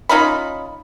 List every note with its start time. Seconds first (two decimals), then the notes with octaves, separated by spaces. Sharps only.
0.09 C#4 D#4 F4 B5